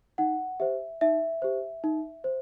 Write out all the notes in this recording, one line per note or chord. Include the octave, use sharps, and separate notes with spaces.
D#4 F#5
G4 C5 E5
D#4 E5
G4 C5
D#4
C5